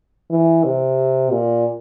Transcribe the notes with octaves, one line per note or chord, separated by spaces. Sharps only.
E3
C3
A#2